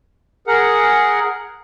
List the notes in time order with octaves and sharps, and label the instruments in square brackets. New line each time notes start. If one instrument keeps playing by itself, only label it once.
[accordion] G#4 A#4 F#5